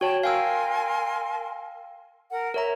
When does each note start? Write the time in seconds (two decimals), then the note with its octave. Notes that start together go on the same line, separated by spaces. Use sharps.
0.01 F#4 C#5 G5 A5
0.23 A#4 F5 G5 G#5 C6 E6
2.30 A#4 F#5
2.54 A#4 C#5 E5 A#5